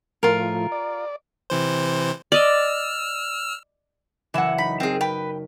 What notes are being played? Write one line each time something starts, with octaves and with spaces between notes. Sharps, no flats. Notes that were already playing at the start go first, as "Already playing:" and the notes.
A2 F3 F4 A#4
D5
C3 E3 C5
D5 D#5 E6 F6
F#1 E3 F#5 G#5 E6
D#4 B5
C4 G#4 A#4
B4 G5